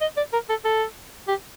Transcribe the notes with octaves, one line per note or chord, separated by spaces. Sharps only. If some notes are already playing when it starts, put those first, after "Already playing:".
D#5
D5
A#4
A4
A4
G4